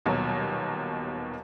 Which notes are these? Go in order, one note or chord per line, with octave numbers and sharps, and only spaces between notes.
D#1 D#2 B2 F#3